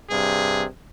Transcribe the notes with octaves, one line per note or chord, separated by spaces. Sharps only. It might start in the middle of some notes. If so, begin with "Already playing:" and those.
G2 C3 G#4